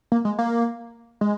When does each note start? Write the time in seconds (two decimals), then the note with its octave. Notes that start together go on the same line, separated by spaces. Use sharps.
0.12 A#3
0.25 G#3
0.39 A#3
1.21 G#3